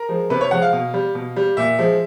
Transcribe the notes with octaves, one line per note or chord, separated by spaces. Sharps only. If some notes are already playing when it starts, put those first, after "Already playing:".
Already playing: A#4
F3 G#3
C3 B4
C#5
F3 G#3 F#5
F5
B2
G3
B2
G3
A#2 E5
F3 G#3